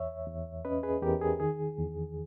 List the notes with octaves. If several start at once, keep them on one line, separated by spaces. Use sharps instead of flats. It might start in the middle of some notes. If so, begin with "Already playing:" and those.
Already playing: E2 C#5 E5
E2
C#4 B4 D#5
G#4 B4
E2 G4 A#4
G#4
D#3 G#4
E2